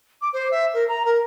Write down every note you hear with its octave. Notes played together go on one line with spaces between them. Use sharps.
D6
C5
E5
A#4
A#5
A#4